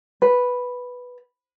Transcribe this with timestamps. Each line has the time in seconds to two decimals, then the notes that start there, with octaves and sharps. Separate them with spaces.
0.22 B4